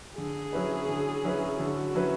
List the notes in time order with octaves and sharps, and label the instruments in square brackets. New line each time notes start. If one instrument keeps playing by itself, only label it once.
[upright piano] D3 [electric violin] G#4
[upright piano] F#3 C#4 E4 B4
D3
F#3 C#4 E4 B4
[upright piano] D3 [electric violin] F#4
[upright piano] F#3 C#4 E4 B4